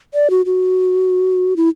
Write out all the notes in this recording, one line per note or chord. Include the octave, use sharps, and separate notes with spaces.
D5
F#4
F#4
E4